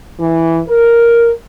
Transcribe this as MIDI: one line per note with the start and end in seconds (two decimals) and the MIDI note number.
0.19 0.59 52
0.68 1.30 70